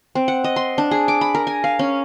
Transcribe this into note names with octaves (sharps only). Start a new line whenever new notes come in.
C4
F#5
D#5
C6
D4
G#4
D6
B5
A#4
G#5
F5
C#4